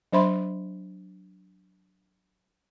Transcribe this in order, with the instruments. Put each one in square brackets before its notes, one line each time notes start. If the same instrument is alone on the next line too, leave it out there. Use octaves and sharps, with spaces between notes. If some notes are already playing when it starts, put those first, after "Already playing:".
[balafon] F#3 D4 C5 E5 B5 C6